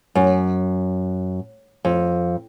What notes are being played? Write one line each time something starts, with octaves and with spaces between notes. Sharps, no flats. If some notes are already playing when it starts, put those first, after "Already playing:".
F#2
F2